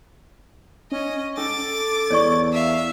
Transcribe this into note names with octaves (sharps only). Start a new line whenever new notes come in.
C#4 D#5
C#4 A4 D6 A6
E2 C#5 D5 C#6
E5 F5